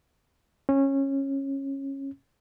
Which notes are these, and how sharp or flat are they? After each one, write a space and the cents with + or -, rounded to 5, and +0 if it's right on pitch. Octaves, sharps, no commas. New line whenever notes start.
C#4 -20